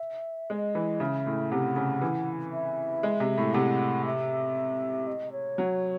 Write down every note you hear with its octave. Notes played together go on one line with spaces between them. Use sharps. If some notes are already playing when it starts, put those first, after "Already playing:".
Already playing: E5
G#3 D#5
E3
C#3 E5
A2
C3 F#5
C#3
E3
E5
G#3
C3
A2
C3 F#5
E5
D#5
C#5
F#3